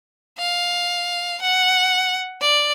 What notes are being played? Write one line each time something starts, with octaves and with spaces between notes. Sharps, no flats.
F5
F#5
D5